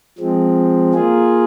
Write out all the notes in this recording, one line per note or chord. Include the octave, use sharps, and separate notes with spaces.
F3 G#3 C4
A#3 F4 G#4